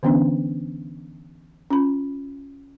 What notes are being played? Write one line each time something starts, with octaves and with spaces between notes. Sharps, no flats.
D3 E3 B3 C#4 D4
C#4 F4 B5